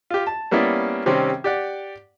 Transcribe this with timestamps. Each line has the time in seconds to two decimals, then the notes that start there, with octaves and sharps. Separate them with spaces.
0.10 F4 G4
0.27 A5
0.51 G3 A#3 B3 C#4 E4 D5
1.06 C3 D#3 G3 C4 C#4
1.44 G4 D5 F#5